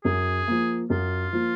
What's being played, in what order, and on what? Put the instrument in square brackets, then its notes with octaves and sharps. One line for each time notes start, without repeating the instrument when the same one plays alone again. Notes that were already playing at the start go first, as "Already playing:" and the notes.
[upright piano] F#2 [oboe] G#4
[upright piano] F3 A#3
[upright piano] F#2 [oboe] F4
[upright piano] F3 A#3